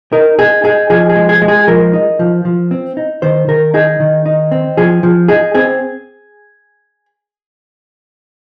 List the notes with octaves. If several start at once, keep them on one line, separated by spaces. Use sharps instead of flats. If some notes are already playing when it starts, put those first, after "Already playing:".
D#4 A#4
D#4 G#4
D#4 G#4
F3 G#4
G#4
G#3
G#4
G#3
G#4
F3 A#4
D#4
F3
F3
C4
D#4
D#3 C5
D#3 A#4
D#4 G#4
D#3
D#4
C4
F3 G#4
F3
D#4 G#4
C4 G#4